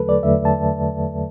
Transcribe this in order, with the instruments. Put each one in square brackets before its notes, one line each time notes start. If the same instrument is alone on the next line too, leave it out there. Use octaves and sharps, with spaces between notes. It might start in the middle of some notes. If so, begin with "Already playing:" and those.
Already playing: [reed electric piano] E2 D3 F#3 A3 A4 B4
D5
E2 D3 F#3 A3 E5
A5